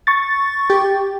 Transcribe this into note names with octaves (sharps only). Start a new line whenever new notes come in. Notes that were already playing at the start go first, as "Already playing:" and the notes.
C#6 A6
G4